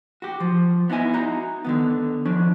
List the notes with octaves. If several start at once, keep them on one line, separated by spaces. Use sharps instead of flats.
F#4 G4
F3
B3 D#4 E4 G#5
D#4 F#4 A#5
D3 D#3 B3
F3 C#4 D4